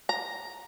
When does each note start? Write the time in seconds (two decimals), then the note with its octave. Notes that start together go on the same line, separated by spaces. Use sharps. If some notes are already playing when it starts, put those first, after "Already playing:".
0.09 A#5